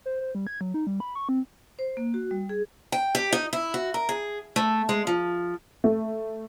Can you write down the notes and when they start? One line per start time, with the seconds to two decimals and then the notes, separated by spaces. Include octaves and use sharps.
0.06 C5
0.21 C5
0.35 G3
0.47 G#6
0.61 F#3
0.74 D#4
0.87 G3
1.00 B5
1.15 C#6
1.29 C4
1.79 C5
1.97 A#3
2.14 F#4
2.31 G3
2.49 G#4
2.92 G5
3.15 G4
3.33 D#4
3.53 E4
3.74 F#4
3.94 A#4
4.09 G#4
4.56 A3
4.89 G#3
5.07 F3
5.84 A3